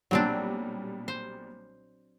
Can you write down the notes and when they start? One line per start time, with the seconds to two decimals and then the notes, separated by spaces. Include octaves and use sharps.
0.11 B1 A#2 F#3 G3 C4 D4
1.08 C5